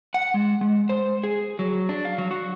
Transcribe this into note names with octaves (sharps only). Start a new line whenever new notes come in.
F#5
G#3
G#3
C5
G#4
F#3
D4
F5
F#3
F#4